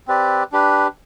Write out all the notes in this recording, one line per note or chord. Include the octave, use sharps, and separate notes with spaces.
C4 G4 B4 D5
D4 G4 B4